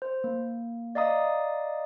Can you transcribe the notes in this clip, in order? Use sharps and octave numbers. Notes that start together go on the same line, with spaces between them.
C5
A#3
D5 D#5 F5 A#5 D#6